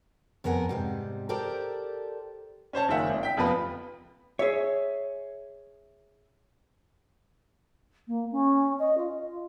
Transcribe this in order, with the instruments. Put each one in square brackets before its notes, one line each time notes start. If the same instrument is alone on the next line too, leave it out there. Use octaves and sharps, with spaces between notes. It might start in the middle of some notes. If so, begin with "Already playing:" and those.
[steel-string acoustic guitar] F2 B3 A#4 F#5 G#5
G#2 C3 G3
G4 A4 A#4 C5 D5
[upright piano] C#4 C5 C#5 A5
F#1 D#3 F4 E5 F#5
G#1
G5 B6
F1 F2 F3 B3 B4 B5
[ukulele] G#4 E5 [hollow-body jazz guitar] C#5
[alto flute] A#3
C#4
D#5
F4